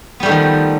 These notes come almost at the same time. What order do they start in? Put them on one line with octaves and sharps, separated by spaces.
B3 G3 A3 D#3 F3